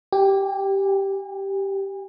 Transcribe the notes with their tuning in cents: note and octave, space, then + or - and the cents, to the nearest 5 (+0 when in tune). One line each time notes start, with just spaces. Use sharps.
G4 -5 G#5 -40